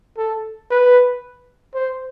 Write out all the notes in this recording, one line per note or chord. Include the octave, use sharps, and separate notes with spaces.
A4
B4
C5